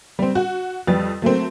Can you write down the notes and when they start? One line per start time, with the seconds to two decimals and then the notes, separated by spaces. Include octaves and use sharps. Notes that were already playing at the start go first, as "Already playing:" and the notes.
0.19 G3 C4
0.35 F#4
0.87 F2 G3 B4 A6
1.22 F#3 A3 A#3 C4